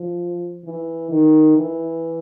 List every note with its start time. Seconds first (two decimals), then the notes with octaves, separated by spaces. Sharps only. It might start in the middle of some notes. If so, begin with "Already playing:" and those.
Already playing: F3
0.65 E3
1.11 D#3
1.57 E3